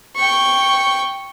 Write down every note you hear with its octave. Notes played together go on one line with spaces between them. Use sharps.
G5 C#6